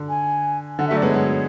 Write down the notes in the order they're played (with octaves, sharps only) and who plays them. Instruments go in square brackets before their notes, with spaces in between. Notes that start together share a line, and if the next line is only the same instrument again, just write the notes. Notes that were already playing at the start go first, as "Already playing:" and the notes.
Already playing: [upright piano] D3
[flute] G#5
[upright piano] D3 [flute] F#5
[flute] E5
[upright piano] F#3 A3
[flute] D5
[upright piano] G#3 B3 [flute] C#5
[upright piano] G#3 B3